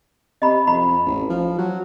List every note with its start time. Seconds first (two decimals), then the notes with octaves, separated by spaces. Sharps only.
0.42 C3 D#5 B5
0.67 F2 B5
1.06 A1
1.30 F3
1.58 F#3